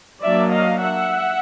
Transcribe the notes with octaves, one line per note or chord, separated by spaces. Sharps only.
F#3 A#3 D4 D5 E5
D#5 F5
E5 F#5